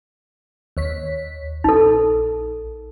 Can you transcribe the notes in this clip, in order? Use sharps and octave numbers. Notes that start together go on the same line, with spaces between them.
D#2 C#5 B6
A#1 D#4 A4